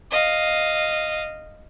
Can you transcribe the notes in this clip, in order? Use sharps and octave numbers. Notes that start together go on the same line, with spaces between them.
D#5 F5